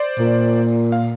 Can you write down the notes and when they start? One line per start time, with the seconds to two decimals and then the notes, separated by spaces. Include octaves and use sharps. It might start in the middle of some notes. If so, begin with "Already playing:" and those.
Already playing: C5 D5
0.19 A#2
0.92 F5